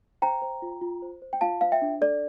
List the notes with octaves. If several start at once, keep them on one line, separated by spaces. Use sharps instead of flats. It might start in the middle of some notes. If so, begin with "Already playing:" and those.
C5 G5 A#5
C5
F4
F4
C5
C5
G5
F4 F5 A5
C5 F5
E5 G5
D4
A4 D5